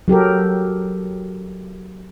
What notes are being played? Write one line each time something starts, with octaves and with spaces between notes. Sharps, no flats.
F#3 G4 A4 A#4